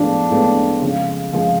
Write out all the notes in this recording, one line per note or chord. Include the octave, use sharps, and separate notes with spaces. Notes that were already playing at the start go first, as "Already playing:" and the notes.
Already playing: A2 F3 G#3 B3 D4
A2 F3 G#3 B3
C#3 F3 G#3
C#3 F3 G#3